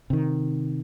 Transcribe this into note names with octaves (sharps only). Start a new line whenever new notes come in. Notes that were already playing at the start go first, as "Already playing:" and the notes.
C3 D#3